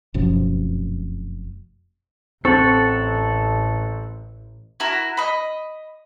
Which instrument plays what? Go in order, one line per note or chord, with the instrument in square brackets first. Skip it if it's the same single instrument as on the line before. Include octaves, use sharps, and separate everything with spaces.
[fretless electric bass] F1 F#2 B2 F3
[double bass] A1 [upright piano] C4 [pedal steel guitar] A4 F#5 [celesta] C#6 A6
[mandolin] E4 F#4 A#4
D#5 B5